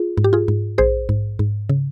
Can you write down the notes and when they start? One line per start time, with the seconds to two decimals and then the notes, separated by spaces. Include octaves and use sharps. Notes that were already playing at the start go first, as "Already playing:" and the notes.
Already playing: F4 G#4
0.17 G#2
0.24 G4
0.33 F4 G#4
0.48 G#2
0.78 A#1 G#4 C5
1.09 G#2
1.39 G#2
1.69 C#3